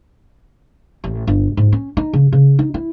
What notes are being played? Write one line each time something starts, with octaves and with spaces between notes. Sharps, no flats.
A1
G1
G#2
C#4
D#4
C#3
C#3
D#4
E4